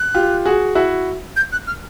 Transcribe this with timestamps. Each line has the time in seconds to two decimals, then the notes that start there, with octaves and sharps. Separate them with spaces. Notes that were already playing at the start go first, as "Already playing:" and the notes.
Already playing: F#6
0.14 F4 G4
0.45 F#4 G#4
0.75 E4 F#4
1.36 G6
1.52 F#6
1.67 F6